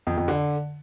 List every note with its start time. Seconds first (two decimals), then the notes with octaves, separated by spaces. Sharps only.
0.07 F2
0.17 F2
0.28 D3